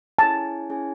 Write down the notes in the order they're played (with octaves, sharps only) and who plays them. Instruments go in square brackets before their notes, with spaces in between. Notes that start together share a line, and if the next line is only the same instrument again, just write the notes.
[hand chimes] C#4 E4 G#4 C#5 G#5 [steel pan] A5
[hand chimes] C#4 E4 G#4 C#5 G#5